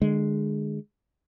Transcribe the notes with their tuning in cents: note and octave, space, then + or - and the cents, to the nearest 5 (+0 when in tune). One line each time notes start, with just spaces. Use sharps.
D3 +30 G#3 +0